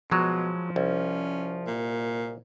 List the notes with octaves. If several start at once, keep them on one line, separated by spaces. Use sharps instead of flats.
B2 F3 F#3 G#3
C2 C#4
A#2